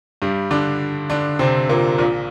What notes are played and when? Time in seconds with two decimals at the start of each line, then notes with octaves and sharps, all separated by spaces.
0.22 G2 G3
0.51 D3 D4
1.10 D3 D4
1.39 C3 C4
1.69 A#2 A#3
1.98 A#1 A#2